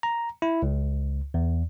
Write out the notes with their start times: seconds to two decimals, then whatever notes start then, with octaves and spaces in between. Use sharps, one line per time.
0.03 A#5
0.42 E4
0.63 C#2
1.34 E2